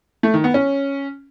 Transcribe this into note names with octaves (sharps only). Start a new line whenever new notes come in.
A3
D#3
B3
C#4